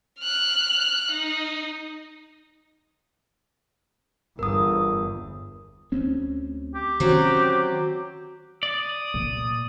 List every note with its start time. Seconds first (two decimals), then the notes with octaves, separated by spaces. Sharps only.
0.20 F6 F#6
1.11 D#4
4.39 G1 E2 A#4 D#6
5.92 D2 C4 C#4
6.75 G4
7.00 D#3 F#3 C4 C#4
8.63 D5 D#6
9.14 A#2